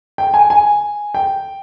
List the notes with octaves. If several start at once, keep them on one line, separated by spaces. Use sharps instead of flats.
G5
G#5
G#5
G5